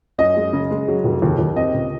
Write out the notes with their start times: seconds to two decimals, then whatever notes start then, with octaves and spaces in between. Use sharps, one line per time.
0.18 F#2 D#5
0.37 G#3
0.53 C#3
0.71 G#3
0.88 F#3
1.04 F1
1.22 D#2
1.39 D#2
1.56 C4 D#5
1.74 C#2